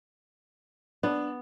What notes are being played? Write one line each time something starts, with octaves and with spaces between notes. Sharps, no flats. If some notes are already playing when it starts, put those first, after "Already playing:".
B3 D4